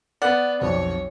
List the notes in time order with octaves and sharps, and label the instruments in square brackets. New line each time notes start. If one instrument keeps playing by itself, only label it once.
[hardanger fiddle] B3 [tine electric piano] D5 [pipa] F#5
[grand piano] B1 F2 [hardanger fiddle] C#5